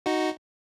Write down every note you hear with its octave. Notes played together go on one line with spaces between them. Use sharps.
D#4 F#4